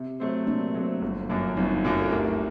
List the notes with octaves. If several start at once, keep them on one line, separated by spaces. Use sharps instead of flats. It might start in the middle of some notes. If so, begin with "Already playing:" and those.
Already playing: C3
F#3 A3 C4
C3 A#3 D4
F#3 A3 C4
G1
F#2 F#3 A#3 D4
G1 C4 D#4
F#2 F#3 A#3 D4
A4
D2 G4 A#4